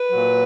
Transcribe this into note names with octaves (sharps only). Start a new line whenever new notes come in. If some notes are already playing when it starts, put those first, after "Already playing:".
Already playing: B4
A#2 F#3